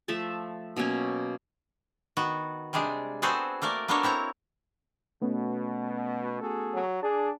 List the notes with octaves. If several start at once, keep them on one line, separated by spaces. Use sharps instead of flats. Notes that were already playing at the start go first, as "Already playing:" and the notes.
F3 A3 E5 A5
B2 F#3 A#3 C#4
D#3 B3 F#4
C3 G3 G#3 D4 G#4
B3 C4 F#4 G#4 A4 C5
A3 A#3 A#4 D5
A#3 B3 D4 A4 A#4 C#5
C4 E4 C#5 A#5
B2 A3 B3 C#4
F#4 G#4 A4
F#3
D4 G#4 A5